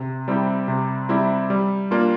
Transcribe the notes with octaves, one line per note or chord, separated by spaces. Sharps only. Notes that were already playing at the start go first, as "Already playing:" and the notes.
Already playing: C3
G3 C4 E4 G4
C3
G3 C4 E4 G4
G3
A#3 D4 F4